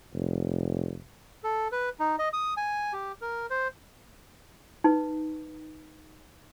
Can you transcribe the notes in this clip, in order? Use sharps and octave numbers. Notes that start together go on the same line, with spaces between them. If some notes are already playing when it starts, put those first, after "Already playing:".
F1
A4
B4
D#4
D#5
D#6
G#5
G4
A#4
C5
D#4 B4